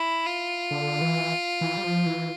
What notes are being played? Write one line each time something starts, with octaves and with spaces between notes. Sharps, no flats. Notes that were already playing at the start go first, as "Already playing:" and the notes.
Already playing: E4
F4
D3
E3
E3
G3
F3
E3